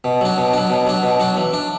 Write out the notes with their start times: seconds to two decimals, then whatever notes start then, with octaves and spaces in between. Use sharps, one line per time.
0.04 B2
0.21 F#3 D4
0.38 B2
0.53 F#3 D4
0.70 B2
0.86 F#3 D4
1.03 B2
1.20 F#3 D4
1.37 E3
1.53 D4